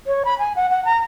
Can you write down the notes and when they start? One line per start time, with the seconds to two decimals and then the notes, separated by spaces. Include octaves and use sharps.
0.07 C#5
0.25 B5
0.39 G#5
0.56 F#5
0.70 F#5
0.85 A#5